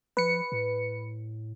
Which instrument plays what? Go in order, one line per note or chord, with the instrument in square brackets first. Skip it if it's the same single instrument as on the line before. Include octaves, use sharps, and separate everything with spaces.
[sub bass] F3 [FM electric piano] B4 C#7
[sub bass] A2